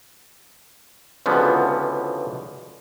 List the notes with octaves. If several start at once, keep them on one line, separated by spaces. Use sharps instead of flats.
C#2 B2 D3 E3 F3 B3